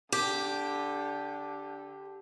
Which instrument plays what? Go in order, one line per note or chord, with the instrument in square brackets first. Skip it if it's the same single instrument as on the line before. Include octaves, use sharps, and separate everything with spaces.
[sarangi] D3 [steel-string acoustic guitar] G4